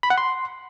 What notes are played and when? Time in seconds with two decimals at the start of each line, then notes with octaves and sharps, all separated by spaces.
0.03 B5
0.10 F#5
0.18 C6